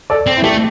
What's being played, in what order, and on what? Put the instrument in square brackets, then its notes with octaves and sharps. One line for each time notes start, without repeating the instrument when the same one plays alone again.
[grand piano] A4 D5
[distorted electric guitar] C4
[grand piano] E4
[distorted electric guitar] A3 [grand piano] G4